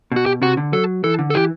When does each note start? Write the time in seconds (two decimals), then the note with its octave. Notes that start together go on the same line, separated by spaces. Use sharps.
0.12 B2 F#4
0.26 G4
0.42 C3 F#4
0.57 D3
0.73 F#3 A4
1.04 E3 A4
1.19 D3
1.30 A4
1.34 E3 G4